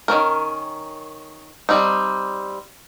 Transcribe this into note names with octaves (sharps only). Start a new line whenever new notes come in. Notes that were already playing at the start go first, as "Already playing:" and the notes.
D#3 F#3 C#4 A#4
G3 C4 D#4